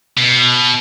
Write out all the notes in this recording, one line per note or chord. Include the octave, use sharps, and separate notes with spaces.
B2